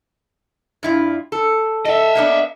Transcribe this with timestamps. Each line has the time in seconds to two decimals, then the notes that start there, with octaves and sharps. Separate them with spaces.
0.83 G2 E4 F4
1.32 A4
1.85 A4 D#5 E5
2.15 A#3 B3 D4